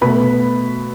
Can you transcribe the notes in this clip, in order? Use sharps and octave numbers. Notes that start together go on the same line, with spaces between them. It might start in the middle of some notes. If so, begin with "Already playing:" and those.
B2 A3 B4 B5